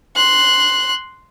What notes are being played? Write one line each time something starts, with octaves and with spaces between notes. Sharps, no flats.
C6 F#6